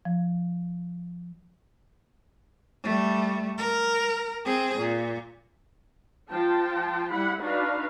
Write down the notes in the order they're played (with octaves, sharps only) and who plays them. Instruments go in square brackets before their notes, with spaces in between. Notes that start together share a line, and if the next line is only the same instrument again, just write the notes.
[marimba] F3
[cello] G3 A3
A#4
C4 G#4
A#2
[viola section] F3 F4 G5 A5
G3 E4 F#5 B5
D4 D#4 F#4 B4 F5